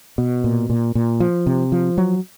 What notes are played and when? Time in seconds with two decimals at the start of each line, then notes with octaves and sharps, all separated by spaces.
0.18 B2
0.44 A#2
0.70 A#2
0.95 A#2
1.20 F3
1.46 C3
1.72 F3
1.98 F#3